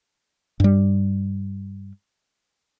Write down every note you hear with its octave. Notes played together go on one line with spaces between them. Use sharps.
G2 G3